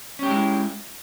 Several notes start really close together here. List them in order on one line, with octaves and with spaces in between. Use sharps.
C#4 G4 G#3 E4